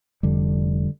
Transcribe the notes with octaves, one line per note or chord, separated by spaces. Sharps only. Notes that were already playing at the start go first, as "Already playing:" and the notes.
F1 F2 D3 G3